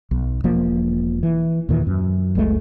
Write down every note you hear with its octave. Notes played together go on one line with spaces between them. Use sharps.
B1
E1 F3 A#3
E3
D#2 A#2 D#3 E3
F#2
F#1 C#2 G#3 A3